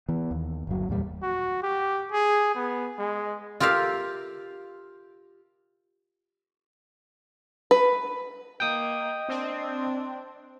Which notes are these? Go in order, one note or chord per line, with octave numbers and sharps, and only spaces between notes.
E3 B3
D#2
G1 F#3
E2 A#2 G3
F#4
G4
G#4
B3
G#3
F4 G4 A#4 E5 F5
B4
A#3 D#5 G5 D#6
C4 D4